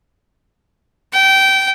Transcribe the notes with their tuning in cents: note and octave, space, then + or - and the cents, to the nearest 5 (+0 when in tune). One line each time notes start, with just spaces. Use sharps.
G5 -20